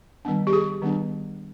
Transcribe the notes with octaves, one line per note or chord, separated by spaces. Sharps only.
D#3 G3 B3 D4
G4
G#4
D#3 G3 B3 D4